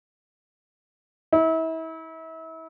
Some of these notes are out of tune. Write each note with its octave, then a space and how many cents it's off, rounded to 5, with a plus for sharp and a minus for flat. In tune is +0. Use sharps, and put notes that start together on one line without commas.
E4 -35